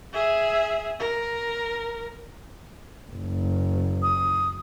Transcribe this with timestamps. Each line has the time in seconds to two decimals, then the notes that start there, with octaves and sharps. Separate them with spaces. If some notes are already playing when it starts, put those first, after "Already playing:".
0.13 G#4 E5
0.99 A#4
3.12 F#1
4.03 D#6